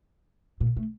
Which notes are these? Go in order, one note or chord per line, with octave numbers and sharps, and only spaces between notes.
A#2
A3